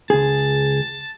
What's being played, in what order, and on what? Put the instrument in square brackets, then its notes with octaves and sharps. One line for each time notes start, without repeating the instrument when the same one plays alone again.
[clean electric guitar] C#2 G#4 [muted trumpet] A5